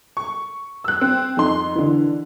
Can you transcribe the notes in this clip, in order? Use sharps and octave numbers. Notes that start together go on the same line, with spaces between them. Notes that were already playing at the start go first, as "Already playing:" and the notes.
C#6
E6 F#6
C4
F2 D#4 C6
D3 E3